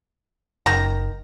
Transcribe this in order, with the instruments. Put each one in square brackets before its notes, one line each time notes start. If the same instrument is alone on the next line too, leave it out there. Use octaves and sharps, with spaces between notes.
[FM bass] F#1 [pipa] D#3 A#5